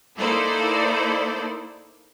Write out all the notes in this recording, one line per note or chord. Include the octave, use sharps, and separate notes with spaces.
A#3 D#4 E4 A4 C5 D5